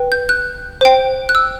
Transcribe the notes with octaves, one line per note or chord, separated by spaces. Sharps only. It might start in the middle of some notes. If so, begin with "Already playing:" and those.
Already playing: B4 G5
G6
F#6
C5 G5
F#6
E6